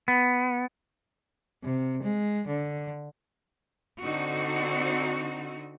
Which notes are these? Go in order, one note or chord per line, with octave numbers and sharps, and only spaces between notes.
B3
C3
G#3
D3
D3 C4 D#4 F#4